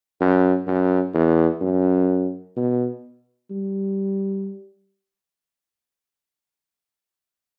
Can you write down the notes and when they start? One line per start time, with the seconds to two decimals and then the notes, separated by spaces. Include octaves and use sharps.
0.21 F#2
0.67 F#2
1.14 E2
1.61 F#2
2.56 B2
3.51 G3